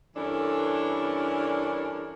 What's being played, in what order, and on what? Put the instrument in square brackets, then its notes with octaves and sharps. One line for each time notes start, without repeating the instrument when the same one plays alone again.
[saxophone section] G2 E3 C#4 D4 A4 A#4